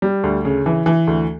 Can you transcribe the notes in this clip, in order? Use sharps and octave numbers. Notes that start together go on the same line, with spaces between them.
G3
D2
C#3
E3
E3
D2